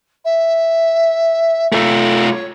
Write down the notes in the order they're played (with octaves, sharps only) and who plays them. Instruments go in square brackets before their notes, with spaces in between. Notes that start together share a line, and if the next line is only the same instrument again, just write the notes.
[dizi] E5
[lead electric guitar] A3 F4 [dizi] A4
[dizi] C#5